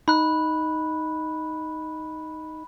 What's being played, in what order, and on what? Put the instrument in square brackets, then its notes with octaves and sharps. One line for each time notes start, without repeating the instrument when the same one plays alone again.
[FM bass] D#4 [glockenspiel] B5 F#6